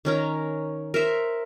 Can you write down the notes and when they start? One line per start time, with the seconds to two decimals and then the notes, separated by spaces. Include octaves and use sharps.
0.05 D#3 C#4 A#4
0.94 A#4 C5 E5